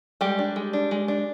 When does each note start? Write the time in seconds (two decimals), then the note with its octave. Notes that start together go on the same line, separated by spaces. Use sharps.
0.21 G3 G#3 G4
0.39 D4
0.56 G#3
0.73 D4
0.91 G#3
1.08 D4